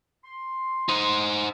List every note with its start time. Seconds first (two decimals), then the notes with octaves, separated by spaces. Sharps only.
0.25 C6
0.89 D#4 C5